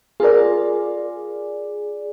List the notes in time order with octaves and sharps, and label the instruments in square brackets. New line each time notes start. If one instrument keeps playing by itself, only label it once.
[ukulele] F4 A#4 [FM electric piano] G#4 D5